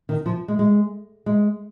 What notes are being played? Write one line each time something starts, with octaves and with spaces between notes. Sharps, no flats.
D#3
F3
G#3
G#3
G#3